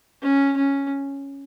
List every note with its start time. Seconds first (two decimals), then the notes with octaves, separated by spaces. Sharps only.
0.22 C#4
0.57 C#4